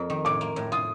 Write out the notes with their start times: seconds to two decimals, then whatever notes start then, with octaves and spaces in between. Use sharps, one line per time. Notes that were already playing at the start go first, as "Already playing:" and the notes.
Already playing: F2 A#3
0.10 D#3
0.25 A2 D6
0.41 A#3
0.56 A2
0.72 F4 D#6